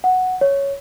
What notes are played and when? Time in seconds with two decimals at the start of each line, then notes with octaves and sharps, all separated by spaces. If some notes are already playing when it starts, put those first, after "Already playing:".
0.04 F#5
0.41 C#5